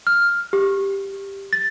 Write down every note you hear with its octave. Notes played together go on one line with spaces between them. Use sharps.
F6
G4
A6